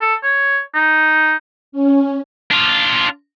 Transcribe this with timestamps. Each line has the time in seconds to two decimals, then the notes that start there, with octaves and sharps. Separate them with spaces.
0.02 A4
0.23 C#5
0.75 D#4
1.72 C#4
2.51 D4 F4